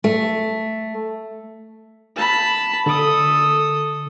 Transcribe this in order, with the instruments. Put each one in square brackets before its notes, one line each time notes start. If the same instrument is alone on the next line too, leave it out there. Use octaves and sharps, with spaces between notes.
[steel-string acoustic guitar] A3
[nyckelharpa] A5 B5
[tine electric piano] D3 [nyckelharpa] A4 D#6